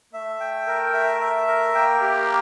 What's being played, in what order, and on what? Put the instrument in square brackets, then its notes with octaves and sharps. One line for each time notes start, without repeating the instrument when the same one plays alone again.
[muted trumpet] A3 [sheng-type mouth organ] E5
[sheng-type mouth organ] G5
A#4
E5
E5
A#4
[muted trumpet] A#3 [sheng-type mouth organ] G5
[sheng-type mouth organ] G4